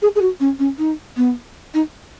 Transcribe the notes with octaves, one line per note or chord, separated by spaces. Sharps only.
G#4
G#4
F#4
C#4
C#4
D#4
B3
D#4